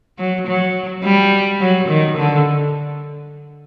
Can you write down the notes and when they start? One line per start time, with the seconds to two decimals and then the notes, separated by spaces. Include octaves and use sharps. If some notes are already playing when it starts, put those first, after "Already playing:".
0.19 F#3
0.47 F#3
1.04 G3
1.61 F#3
1.88 D#3
2.17 D3